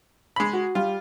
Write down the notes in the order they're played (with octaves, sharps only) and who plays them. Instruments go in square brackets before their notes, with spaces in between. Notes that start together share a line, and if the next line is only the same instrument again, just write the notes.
[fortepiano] G#3 B5
[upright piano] F#4
[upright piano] G3 [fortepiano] F4